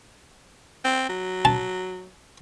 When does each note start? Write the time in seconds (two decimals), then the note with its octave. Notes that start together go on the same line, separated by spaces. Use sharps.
0.85 C4
1.09 F#3
1.45 A5